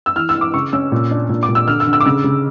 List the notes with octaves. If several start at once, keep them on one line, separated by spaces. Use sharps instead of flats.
E6
E3 F6
E6
E3
D6
C#3 C#6
C#4 E6
A#2
D4
A#2
D6
A#2
E6
D3 F6
E6
D3
E6
D6
C#3 E6
C#3